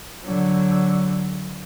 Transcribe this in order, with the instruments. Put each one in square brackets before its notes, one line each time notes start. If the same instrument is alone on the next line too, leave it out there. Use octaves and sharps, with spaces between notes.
[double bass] D3 F#3